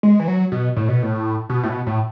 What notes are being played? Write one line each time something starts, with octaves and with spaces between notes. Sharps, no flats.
G#3
E3
F#3
B2
A2
B2
A2
B2
A2
B2
A2